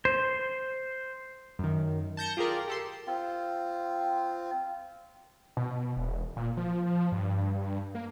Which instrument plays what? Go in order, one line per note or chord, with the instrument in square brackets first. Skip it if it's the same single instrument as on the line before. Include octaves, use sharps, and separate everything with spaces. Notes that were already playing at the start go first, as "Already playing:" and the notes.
[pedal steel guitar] C5
[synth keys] F#2 D#3
A5 G6 A#6 C#7
F4 G4 G#4 A#4 D5
G4 A4 C6
[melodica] C4 F4
[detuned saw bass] B2
E1
A#2
F3
G2
A#3